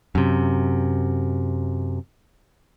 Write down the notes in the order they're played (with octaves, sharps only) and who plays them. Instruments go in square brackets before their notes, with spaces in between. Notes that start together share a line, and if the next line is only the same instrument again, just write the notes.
[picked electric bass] F#2 C3